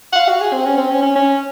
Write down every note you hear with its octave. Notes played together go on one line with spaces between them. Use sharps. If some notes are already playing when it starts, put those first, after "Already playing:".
F#5
F5
F#4
G#4
C4
C#4
C4
C#4
C#4
C#4